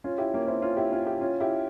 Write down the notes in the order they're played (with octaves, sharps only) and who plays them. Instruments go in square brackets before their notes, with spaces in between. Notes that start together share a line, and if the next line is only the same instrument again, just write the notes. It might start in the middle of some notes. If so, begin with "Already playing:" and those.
[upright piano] C#4 F4
E4 G4
A#3 C#4
C4 E4
C#4 F4
E4 G4
C#4 F4
E4 G4
C#4 F4
E4 G4